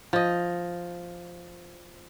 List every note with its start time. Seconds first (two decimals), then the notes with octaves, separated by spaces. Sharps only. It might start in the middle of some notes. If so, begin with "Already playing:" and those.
0.13 F3 D#5